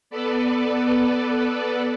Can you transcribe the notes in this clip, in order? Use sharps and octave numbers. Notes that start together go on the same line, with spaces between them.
B3 A4 B4 D5